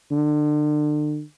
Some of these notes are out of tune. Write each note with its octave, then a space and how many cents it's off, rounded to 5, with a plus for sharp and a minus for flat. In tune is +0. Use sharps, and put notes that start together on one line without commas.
D3 +35